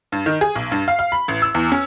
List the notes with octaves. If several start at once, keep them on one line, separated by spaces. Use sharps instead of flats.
G2
D#3
G#4
B1
G2
F5
F5
B5
A1
E6
E2
C#4